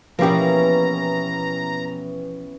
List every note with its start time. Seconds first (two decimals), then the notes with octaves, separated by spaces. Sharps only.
0.19 B2 E3 F3 A#3 C#4 G4 B4 A#5